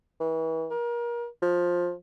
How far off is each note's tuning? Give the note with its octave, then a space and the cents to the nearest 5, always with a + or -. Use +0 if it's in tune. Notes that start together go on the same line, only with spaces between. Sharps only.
E3 -35
A#4 +30
F3 +15